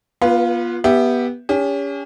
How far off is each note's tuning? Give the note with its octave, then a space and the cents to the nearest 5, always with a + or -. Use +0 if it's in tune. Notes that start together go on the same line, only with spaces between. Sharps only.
B3 -40 F4 +0 B4 +0
B3 -15 G4 +0 E5 +5
C#4 +30 G4 +45